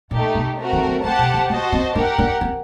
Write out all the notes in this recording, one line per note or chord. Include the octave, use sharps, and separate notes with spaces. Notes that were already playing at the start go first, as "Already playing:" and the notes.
A#2 A3 D#4 G4
C3
A3 C4 F#4 A#4
D#3
G3
A3 G4 C5 F#5 A5
C3
D3
A3 F#4 C5 D#5 A5
C4
D4 G4 A#4 F#5
D4
C4